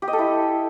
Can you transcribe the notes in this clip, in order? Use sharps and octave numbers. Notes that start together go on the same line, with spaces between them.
G4
D#5
A4
E4